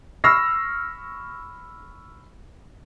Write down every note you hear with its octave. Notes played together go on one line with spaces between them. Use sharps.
B5 C#6 E6 F6 A#6 C7